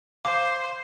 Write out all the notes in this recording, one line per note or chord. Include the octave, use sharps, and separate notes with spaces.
C5 F5 D6